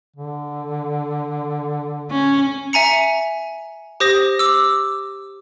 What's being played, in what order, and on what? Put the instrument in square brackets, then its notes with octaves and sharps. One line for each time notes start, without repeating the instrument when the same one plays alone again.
[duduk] D3
[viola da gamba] C#4
[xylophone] E5 G#5 A#5 C#7
G4 C5 D#6 A#6
D6 E6